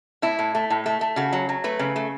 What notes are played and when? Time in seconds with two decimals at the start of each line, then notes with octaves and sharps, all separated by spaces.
0.22 A2 E4
0.39 A2
0.55 A3
0.70 A2
0.86 A3
1.01 A3
1.16 C#3 F#4
1.33 F#3
1.49 F#3
1.64 A3 B4
1.79 C#3
1.96 A3